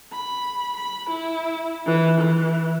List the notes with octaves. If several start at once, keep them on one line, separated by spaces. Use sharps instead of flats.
B5
B5
E4
E3
E3